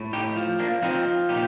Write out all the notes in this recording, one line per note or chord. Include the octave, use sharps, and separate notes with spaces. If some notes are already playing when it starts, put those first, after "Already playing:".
Already playing: A2
D#4 G4
F3
A#3 D4
F3 C4 D#4
A#2 D#4 G4